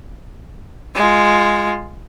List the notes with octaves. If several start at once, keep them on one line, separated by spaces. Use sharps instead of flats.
G#3 F4